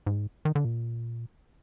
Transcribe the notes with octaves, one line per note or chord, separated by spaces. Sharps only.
G#2
D#3
D3
A#2